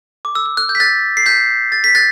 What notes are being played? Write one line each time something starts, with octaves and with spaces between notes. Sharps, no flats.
D6
E6
E6
F#6
G6
B6
F#6 A6
C7
G6 B6
A6
B6
F#6 A6